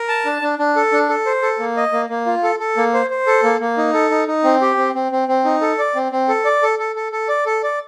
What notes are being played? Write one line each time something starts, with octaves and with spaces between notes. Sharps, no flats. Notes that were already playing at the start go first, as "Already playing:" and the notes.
Already playing: A#4
A5
D4
D4
D4
A4
D4
A4
C5
A4
A#3
D#5
A#3
A#3
F4
A4
A4
A#3
C5
C5
A4
A#3
A#3
D#4
A4
D#4
D#4
C4
G4
C4
C4
C4
C4
D#4
A4
D5
C4
C4
A4
D5
A4
A4
A4
A4
D5
A4
D5